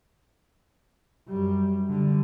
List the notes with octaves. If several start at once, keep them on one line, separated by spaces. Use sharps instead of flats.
F#2 G3
D3 G3